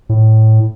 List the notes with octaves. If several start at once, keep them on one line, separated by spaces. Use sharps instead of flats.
A2